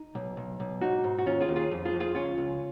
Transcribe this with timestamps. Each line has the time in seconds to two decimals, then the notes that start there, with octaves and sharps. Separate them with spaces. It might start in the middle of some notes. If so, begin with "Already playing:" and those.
Already playing: D#4
0.15 B1
0.37 B1
0.60 B1
0.81 G#2 D#4 F#4
1.04 G#2
1.19 F#4
1.26 D#2 C#4 F4
1.41 F4 G#4
1.48 D#2
1.56 F4 G#4
1.71 F2
1.85 F4 G#4
1.93 F2
2.00 F4 G#4
2.15 C#2 C#4 F4
2.38 C#2